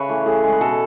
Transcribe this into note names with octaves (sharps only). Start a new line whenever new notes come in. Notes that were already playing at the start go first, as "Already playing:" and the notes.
Already playing: C#3 B4 C#5 E5
E3 A3
A2 G#4
G#3
B4
B2 A4